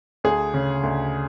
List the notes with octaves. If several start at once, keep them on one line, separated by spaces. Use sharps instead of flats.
D2 G#4
C#3
D2